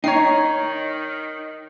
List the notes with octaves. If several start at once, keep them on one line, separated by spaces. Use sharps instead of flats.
D#3 D#4 C#5 G5 A#5 C7